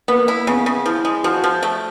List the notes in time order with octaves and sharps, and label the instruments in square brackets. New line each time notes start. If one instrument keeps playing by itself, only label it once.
[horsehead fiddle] A#3 [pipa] B3
[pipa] E4
[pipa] C#3 [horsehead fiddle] B3
[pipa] C#3
[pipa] F3 [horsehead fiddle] E4
[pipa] G#3
[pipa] F3 [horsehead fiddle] F#4
[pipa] F3
A3